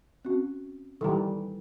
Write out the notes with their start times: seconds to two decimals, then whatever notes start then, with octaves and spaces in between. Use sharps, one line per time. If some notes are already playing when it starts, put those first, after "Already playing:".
0.25 C4 C#4 F#4
1.01 D#3 E3 G3 A4